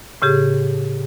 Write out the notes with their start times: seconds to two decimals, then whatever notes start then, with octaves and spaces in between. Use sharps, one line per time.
0.22 A2 C#3 G4 G#4